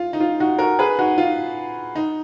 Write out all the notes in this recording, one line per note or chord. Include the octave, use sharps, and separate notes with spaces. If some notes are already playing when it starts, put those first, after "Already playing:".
Already playing: F4
D#4
F4
D#4 F#4
F#4 A#4
G#4 B4
D#4 F#4
F4
D#4